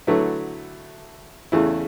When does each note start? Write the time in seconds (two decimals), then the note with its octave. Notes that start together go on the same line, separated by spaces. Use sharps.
0.07 D3 F#3 A3 E4 B4
1.52 E2 C#3 E3 A3 E4